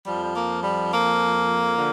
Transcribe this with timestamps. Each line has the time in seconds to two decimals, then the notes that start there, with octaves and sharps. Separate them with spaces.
0.06 F2 F3 G3
0.23 G3
0.34 A#3
0.62 G3
0.91 A#3
1.76 D3 F3